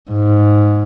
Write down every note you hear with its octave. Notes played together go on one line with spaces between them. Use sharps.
G#2